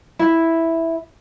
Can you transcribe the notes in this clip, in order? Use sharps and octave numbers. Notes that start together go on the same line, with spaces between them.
E4